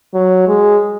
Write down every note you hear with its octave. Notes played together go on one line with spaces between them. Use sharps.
F#3
G#3